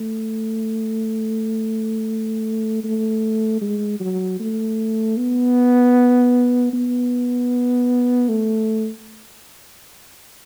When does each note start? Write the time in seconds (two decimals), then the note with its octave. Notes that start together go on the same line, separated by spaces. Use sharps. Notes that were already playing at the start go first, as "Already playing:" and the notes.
Already playing: A3
2.84 A3
3.61 G#3
4.00 F#3
4.39 A3
5.17 B3
6.73 B3
8.29 A3